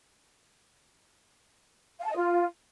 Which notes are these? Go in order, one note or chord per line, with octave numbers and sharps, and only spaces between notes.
F5
A5
D#5
F4